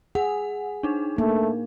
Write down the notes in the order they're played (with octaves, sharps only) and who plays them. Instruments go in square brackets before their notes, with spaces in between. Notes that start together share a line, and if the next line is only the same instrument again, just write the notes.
[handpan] G#4 [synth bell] F#5
[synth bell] D4 D#4
[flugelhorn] A3 [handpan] A#3